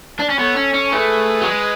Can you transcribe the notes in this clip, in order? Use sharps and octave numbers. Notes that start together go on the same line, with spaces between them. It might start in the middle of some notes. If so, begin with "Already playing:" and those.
D4
C#4
B3 A4 C#5
C#4
C#4
A3 G#4 B4
F#3
G#3